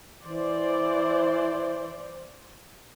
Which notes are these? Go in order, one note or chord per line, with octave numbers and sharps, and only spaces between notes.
E3 C5 D5